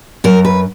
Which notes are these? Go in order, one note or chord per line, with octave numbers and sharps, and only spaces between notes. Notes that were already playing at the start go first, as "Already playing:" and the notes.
F#2 A#4
B4